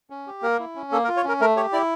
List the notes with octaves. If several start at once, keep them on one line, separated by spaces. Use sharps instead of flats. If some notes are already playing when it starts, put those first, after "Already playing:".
C#4
G4
A#3 A#4
E4
C#4
A#3 A4
A#4
F4
C#5
C#4 A#4
A3 A#4
G4 C#5
E4 D5